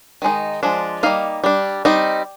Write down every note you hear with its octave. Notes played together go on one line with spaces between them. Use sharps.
D#3 G#3 D#4
F3 G#3 D4
G3 A#3 D#4 F5
G3 D4
G3 C4 D#4